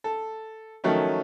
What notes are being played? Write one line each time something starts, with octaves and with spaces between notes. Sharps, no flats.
A4
D#3 F3 F#3 A3 C#4